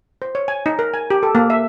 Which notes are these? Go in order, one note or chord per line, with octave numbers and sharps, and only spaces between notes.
C5
C#5
G#5
D#4
A#4
G#5
G4
A4
A#3
E5